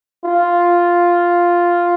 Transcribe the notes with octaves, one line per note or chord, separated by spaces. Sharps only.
F4